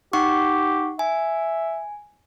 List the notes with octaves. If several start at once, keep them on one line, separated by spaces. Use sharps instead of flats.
D#4 G4 F#5 C#6
E5 G#5